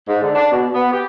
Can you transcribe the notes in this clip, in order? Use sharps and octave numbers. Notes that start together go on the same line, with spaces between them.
G#2
D3
D4
B2
B3
G4